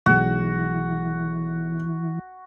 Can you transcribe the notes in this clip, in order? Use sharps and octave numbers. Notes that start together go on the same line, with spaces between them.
B1 E3 G#3 F#4